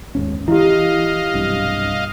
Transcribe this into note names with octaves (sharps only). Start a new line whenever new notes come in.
D#2 G#2 C#4
E3 E4 G4 D#5 F5
B1 G2 C3